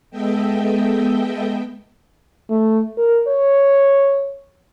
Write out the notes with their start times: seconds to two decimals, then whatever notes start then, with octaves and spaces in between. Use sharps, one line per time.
0.10 G#3 B3 A4 D#5 E5 G5
2.49 A3
2.98 A#4
3.28 C#5